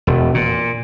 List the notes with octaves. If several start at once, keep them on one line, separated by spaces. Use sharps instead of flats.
E1
A#2